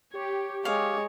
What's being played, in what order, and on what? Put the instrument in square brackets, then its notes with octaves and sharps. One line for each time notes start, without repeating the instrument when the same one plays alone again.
[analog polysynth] G4 [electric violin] C#5
[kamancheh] G#3 [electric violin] C#5 [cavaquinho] F5 D6